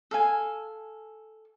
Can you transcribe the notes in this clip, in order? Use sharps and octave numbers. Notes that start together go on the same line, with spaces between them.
A4 F5 G#5